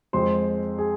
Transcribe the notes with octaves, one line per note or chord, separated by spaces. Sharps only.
F2 F3 G#3 C5 C6
G#4 G#5